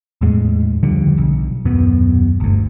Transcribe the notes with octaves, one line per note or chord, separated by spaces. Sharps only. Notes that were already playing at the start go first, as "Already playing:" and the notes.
E2 A2 G#3
C#2 D3 F3 G3
B1
D#1 F#2 B2 B3
G1 D2